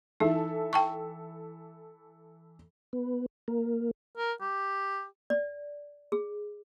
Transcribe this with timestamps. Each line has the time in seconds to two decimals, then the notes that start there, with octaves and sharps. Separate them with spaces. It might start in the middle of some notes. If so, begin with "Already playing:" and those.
0.20 E3 D#4 A4 E5
0.73 G5 A5 C#6
2.93 B3
3.48 A#3
4.18 A#4
4.41 G4
5.30 D5
6.12 G#4